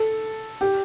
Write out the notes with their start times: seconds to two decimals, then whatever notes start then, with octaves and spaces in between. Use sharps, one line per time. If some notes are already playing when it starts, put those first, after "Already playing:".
Already playing: A4
0.61 G4